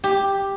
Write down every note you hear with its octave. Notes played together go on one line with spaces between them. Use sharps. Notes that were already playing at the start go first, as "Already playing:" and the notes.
G4